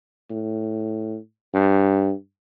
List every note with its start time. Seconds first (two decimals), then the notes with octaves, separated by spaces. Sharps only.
0.30 A2
1.54 G2